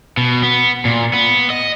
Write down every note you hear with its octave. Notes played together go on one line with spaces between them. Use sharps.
B2
B3
A#2
B3
D#5